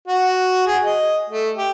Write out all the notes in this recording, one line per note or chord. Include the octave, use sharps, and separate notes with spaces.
F#4
G#4
D#5
A3
G4